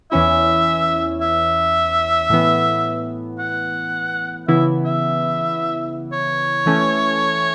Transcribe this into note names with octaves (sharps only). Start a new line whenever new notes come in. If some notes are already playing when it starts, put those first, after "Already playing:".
E2 E3 C#4 E4 E5
E5
A2 E3 B3
F#5
C#3 E3 B3 E4 E5
E5
C#5
E3 A3 C#4